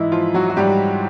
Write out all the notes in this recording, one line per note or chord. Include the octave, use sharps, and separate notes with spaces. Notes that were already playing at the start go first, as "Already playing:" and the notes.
Already playing: G#2 E3 D#4 E4
F3 F4
F#3 F#4
F#4
G#2 G3 G4